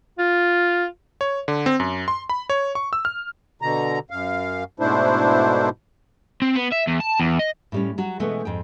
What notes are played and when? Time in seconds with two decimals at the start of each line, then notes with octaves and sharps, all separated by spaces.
0.18 F4
1.21 C#5
1.48 D3
1.66 C4
1.80 F#2
2.08 C6
2.29 B5
2.50 C#5
2.75 C#6
2.93 E6
3.05 F6
3.62 B2 D3 A#5
4.10 F#2 F5
4.80 G#2 B2 A3 D4 E4 C5
6.42 C4
6.55 B3
6.72 E5
6.87 E2
7.00 A5
7.20 E2
7.39 D#5
7.72 A2 G3 C#4
7.98 F#3 F#4
8.20 B2 E3 G#3 A3 B3 C#4
8.45 F2 G#2 G5